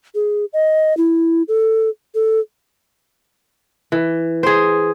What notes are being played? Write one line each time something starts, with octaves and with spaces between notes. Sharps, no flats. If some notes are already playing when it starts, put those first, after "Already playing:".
G#4
D#5
E4
A4
A4
E3
G#4 C5